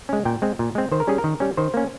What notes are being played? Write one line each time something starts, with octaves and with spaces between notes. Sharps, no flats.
G#3 C#4
A#2 G5
G#3 C4
A#2
G#3 C4
D#3 C5
A#4
G3 C#4 G#4
A#4
D#3
G3 C#4
D#3 C5
A#3 C#4